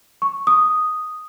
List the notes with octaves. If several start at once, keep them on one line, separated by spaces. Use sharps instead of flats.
C#6
D#6